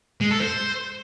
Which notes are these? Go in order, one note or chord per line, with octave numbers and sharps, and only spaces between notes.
G#3
A4
C5